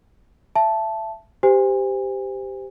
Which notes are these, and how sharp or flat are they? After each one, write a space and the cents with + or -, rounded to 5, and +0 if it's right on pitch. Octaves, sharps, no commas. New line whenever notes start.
E5 +25 A5 -10
G4 +0 C5 -25 G#5 -35